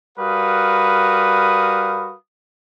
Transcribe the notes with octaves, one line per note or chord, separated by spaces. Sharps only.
G3 F#4 A#4 B4 F5 D#6